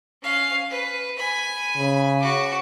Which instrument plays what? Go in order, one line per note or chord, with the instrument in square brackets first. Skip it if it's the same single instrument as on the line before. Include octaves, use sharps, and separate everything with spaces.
[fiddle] C#4 F5
B4
G#5 B5
[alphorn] C#3
[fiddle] F#4 D6